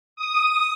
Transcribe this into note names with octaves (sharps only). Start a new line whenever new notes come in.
D#6